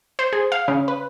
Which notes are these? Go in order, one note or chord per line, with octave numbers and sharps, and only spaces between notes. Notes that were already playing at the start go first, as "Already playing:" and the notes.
C5
G#4
F5
C#3
B4